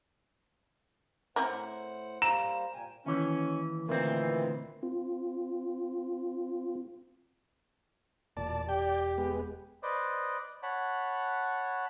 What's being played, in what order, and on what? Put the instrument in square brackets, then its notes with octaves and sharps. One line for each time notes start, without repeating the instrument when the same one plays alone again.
[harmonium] A2 C5 F#5 [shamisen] C4 E4 A#4
[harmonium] G3 A#3 C5 [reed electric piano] A#5 [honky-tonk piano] E7
[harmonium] A#2 G5 G#5
[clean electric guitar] D#2 E3 [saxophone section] C#4
[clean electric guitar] D2 C4 [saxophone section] A#2 D#3 E3
[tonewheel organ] C4 F4
[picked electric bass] E1 [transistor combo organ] A#2 D5 A5
[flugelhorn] G4 [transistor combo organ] D5 G5
[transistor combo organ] G#3 B3
[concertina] B4 C5 D5 D#5
C#5 F#5 A5 B5